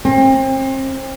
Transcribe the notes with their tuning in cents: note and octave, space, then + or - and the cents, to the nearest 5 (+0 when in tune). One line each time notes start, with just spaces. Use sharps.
C4 +35